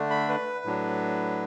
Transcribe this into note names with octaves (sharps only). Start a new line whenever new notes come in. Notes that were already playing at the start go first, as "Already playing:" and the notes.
Already playing: D3 A3 D4
B5
B4
A2 F#3 D4